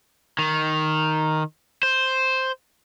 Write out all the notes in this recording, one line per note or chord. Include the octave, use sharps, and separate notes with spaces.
D#3
C5